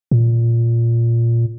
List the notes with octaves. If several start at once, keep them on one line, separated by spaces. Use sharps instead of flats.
A#2